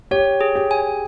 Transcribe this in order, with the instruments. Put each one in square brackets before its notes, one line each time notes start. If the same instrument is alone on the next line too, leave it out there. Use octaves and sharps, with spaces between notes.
[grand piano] G4 [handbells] C#5
[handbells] G#4
[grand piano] G4
[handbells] G#5